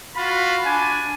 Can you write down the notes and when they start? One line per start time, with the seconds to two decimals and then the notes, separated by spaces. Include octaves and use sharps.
0.15 F4 F#4 B5
0.64 D4 G#5